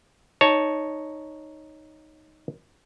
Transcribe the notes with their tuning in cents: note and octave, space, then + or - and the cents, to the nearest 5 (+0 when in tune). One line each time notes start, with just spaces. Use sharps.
D#4 +0 C#5 +0 A5 +0